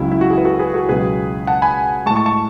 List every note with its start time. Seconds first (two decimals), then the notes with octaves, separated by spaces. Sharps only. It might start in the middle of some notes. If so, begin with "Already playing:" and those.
Already playing: C#2 C#3 F#3 E4
0.12 E4
0.21 F#4
0.30 E4 G#4
0.38 B4
0.45 F#4 A4
0.59 G#4 B4
0.74 F#4 A4
0.89 C#2 B2 F#3 G#4 B4
1.47 F#5 A5
1.62 G#5 B5
2.06 G#3 A5 C#6
2.10 A2
2.16 A5 C#6
2.26 A5 C#6